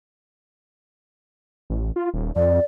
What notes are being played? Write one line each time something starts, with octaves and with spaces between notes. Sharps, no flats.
A1
F4
D#1
F2 D5